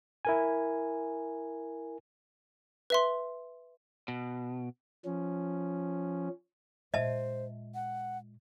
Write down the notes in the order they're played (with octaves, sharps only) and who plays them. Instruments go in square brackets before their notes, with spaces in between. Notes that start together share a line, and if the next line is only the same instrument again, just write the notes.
[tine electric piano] E4 A#4 G#5
[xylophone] B4 E5 C6
[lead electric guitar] B2
[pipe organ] F3 C#4
[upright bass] A#2 G#3 [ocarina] C5 [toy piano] D#5 E5 A5
[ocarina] F#5